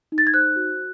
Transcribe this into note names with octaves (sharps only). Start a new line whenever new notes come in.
D#4
A6
G#6
C5 F#6
F#4